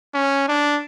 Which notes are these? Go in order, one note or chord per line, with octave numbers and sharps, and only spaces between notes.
C#4
D4